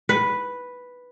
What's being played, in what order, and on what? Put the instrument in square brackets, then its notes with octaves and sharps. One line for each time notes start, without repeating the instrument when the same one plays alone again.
[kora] B4